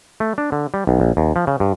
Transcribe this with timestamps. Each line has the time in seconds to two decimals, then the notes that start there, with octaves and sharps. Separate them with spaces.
0.20 A3
0.38 D4
0.52 D3
0.74 G3
0.87 B1
1.00 A#1
1.17 D#2
1.36 F3
1.47 C#3
1.60 G2